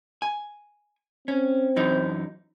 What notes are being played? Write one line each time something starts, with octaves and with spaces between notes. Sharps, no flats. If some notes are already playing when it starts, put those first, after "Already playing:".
G#5
C4 C#4
F#2 E3 D#4